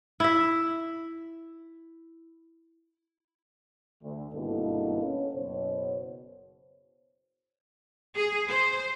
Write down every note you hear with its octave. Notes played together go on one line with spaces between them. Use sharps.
E4 E5
D2
G#1 G2 B2 A#3 E4 A4
C#4
F#1 B2 C5 C#5
G#4
C5